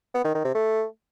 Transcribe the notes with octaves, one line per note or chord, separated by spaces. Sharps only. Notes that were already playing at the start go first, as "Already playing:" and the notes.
B3
D#3
D#3
C3
A3